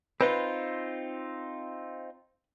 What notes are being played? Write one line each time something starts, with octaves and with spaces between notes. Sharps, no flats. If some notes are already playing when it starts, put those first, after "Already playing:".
C4 D#4 F4 B4